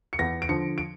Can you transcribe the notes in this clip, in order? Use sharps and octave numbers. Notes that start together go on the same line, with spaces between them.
C#7
E2 A#6
D7
D3 F3 C#7
D7